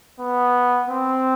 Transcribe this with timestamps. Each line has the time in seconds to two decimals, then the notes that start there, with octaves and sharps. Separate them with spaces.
0.20 B3
0.89 C4